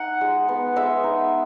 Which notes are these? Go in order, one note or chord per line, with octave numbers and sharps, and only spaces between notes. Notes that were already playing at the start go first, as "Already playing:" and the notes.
Already playing: D#4 F#5
G#3
B3
G#3 E5
D#4